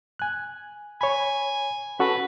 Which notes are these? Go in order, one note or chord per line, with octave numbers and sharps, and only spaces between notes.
G#5 F#6
C#5 G#5 B5
C#4 F#4 A4 B4